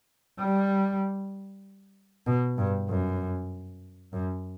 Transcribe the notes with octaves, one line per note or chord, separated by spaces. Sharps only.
G3
B2
G2
F#2
F#2